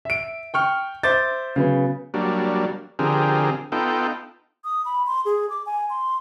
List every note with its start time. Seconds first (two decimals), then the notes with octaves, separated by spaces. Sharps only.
0.05 E5 D7
0.54 G5 C#6 F6
1.03 C5 E5 D6 G6 A6
1.56 C#3 F#3 B3
2.14 F#3 G3 A#3 D4
2.99 D3 F3 C4 G4 G#4 A#4
3.72 B3 D#4 F4 A4 G5
4.64 D#6
4.85 B5
5.07 C6
5.25 G#4
5.50 D6
5.66 G#5
5.90 C6